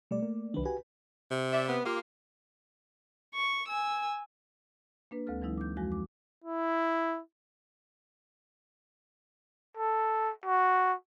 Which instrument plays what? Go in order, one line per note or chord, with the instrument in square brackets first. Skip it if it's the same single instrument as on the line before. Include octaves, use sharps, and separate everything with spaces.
[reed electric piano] B2 G3 [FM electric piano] A3 D5
[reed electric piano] A#3
[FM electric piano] C2 D4 [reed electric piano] D#3 F#3 B4
[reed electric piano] F#4 G4 G#5 [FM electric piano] B4
[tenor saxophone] C3
[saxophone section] D5 E5
B3
A#3 F4 G4
[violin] C#6
G#5 E6
[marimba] A#3 D4 B4
D2 G#3 C4 A4 F6
E3 F#3 G#3 D#4 E4
D6 G6
F2 F3 G#3 F#4 G#5 A#6
D6
[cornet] E4
[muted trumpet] A4
F#4